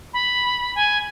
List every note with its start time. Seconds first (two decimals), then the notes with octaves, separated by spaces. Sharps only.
0.14 B5
0.75 G#5